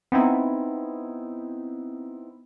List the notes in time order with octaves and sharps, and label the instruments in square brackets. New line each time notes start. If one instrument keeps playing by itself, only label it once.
[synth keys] B3 C4 D#4 E4